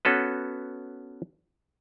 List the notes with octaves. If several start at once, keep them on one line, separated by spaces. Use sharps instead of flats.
B3 C#4 F#4 A4 B4